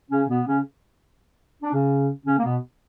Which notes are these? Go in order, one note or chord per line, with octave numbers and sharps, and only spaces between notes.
C#3 C#4
B2 B3
C#3 C#4
D4
C#3 C#4
C#3 C#4
A#3
B2 B3